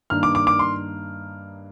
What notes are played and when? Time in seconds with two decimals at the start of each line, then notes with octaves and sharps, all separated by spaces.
0.10 G2 D#3 A#3 D4 F6
0.23 D6
0.35 D6
0.47 D6
0.59 C6